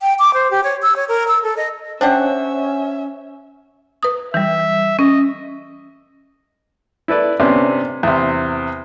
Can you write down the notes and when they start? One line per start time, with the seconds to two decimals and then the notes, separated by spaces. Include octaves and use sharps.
0.01 G5
0.19 D6
0.34 C5
0.51 G4
0.64 C#5
0.82 E6
0.96 C#5
1.08 A#4
1.28 E6
1.43 A4
1.57 D#5
2.01 C#4 D4 G4 C5 C#5 E5 F#5
4.03 B4 D#6
4.34 E3 G3 E5
4.99 C#4 D#5
7.08 E4 A4 B4 D5
7.40 C3 B3 C#4 D4
8.03 E2 C3